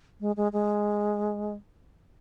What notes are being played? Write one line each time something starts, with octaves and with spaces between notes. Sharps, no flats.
G#3
G#3
G#3